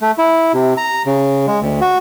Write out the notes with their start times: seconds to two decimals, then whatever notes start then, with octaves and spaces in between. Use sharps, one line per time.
0.01 A3
0.18 E4
0.54 C3
0.77 A#5
1.06 C#3
1.47 G#3
1.61 D2
1.81 F#4